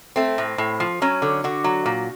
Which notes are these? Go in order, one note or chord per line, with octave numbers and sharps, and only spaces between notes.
A3 C4
A2
A2
F3
F#3 C#4
D3
D3 F#4
F#3
A#2